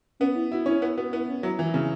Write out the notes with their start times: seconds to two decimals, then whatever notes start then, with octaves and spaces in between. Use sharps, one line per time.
0.20 B3 C#4
0.35 E4
0.51 E4 F#4
0.66 C#4 E4
0.82 B3 E4
0.97 B3 F#4
1.13 B3 E4
1.28 C#4
1.43 F#3 E4
1.58 E3 E4
1.74 C#3 E4